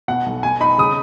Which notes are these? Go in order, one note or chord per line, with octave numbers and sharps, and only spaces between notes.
B2 F#5
B1
B2 G#5
D#4 B5
C#3 D#6